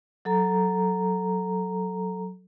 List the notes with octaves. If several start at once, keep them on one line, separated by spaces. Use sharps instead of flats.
F#3 A4 A#5